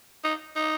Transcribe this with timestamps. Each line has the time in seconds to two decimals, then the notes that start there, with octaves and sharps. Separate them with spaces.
0.24 D#4
0.56 D#4